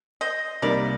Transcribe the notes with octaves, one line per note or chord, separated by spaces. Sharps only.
C5 D#5
C2 C3 G3 A#3 D#4 A#4 D5